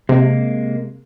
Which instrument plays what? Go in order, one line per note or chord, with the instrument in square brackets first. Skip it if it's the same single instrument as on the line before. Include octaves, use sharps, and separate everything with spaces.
[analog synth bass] C3 [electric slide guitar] G#3 A#3